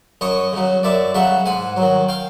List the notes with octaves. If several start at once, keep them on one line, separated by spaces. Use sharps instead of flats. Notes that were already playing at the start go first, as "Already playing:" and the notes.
F#2 C#5 D#5
C#3 F#3
F#2 D5 E5
C#3 F#3 E5 F#5
G#2 F#5 G#5
F#3
D#3
F5 G5